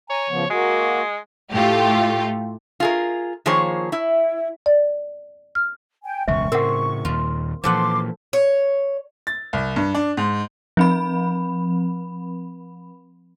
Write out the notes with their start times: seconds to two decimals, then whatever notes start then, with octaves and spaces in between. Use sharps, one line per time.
0.10 C#5 G#5 A#5
0.30 C#3 F3 B3
0.50 G#3 A#3 F#4
1.53 A2 A3 F4 G4
2.80 F4 G#4 A#4
3.46 D#3 F3 A#3 G#4 C5 C#5
3.92 E4
4.66 D5
5.55 F6
6.04 G5 G#5
6.28 E1 C#2 F#2 E5 C#6
6.52 A2 C#3 C4 A#4 F#5
7.05 D#2 A#2 F4
7.64 A#2 E3 F3 A4 F#5 C6 D6
8.33 C#5
9.27 A6
9.53 C2
9.76 G2
9.95 D4
10.17 G#2
10.77 F3 C4 B5